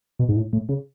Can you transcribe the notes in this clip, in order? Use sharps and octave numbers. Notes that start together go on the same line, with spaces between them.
B2
G#2
A2
A2
C#3